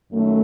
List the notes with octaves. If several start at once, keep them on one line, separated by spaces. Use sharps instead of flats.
F#2 D#3 A3